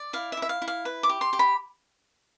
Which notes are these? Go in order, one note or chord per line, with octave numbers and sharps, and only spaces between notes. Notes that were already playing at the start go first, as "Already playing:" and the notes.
Already playing: D5
E4 F5
E5
E4
E5
F5
E4
F5
B4
D6
G4
C6
G4
B5